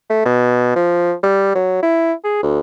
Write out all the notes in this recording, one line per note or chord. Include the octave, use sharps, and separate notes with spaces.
A3
B2
F3
G3
F#3
E4
G#4
D2